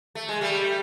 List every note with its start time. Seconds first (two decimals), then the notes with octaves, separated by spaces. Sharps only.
0.15 A3
0.29 G#3
0.41 G3 A3